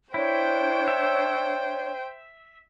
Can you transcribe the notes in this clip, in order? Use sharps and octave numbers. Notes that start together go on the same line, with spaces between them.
D4 E4 C5 C#5 G5
E5